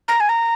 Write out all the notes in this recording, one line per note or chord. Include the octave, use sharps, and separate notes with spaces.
A#5
G#5
A#5